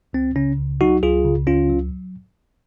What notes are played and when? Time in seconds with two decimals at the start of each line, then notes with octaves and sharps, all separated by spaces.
0.13 C#2 C4
0.36 C#3 C#4
0.58 C#2
0.81 F#3 D#4 F#4
1.02 C#2 F4 G#4
1.24 C#3
1.47 C#2 C#4 F4
1.69 F#3